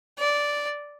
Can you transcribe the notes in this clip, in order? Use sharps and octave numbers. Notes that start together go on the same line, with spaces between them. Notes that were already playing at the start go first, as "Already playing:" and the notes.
D5